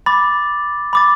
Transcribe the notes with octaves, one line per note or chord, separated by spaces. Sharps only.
B5 D6 A6
B5 D6 A6